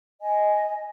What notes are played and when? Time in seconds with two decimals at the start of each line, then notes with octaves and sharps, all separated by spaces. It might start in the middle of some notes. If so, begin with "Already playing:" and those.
0.21 D#5 G#5